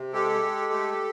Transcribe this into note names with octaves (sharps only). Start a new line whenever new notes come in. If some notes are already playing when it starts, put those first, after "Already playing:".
Already playing: C3
G#3 G4 A4
G#3
A3